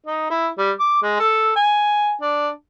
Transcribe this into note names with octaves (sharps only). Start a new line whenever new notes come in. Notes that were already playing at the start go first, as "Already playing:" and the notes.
D#4
E4
G3
D6
G#3
A4
G#5
D4